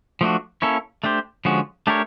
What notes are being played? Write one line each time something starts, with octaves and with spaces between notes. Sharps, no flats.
F3 A3 D4 F#4
A#3 C#4 E4 A4 C#5
A3 D4 G4 C5
D3 F3 G#3 C#4 F#4
A3 D4 G4 A#4 C#5